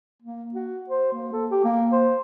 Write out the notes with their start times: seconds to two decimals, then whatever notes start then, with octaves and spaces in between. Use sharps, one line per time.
0.22 A#3
0.54 F#4
0.89 C5
1.13 A#3
1.33 A4
1.51 G4
1.64 A#3
1.92 C5